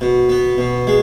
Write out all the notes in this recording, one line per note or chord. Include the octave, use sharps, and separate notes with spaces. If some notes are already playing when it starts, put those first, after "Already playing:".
B2
B3
B2
G#3